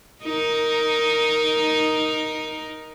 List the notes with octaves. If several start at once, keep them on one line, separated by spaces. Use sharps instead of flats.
D#4 A#4